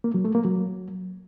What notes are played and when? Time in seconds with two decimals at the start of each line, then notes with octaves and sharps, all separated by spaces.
0.04 A#3
0.14 F#3
0.25 A3
0.35 A#3
0.45 F#3